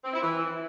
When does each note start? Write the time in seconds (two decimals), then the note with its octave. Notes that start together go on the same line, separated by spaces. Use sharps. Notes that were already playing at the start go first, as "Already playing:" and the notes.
0.04 C4
0.13 E4
0.22 E3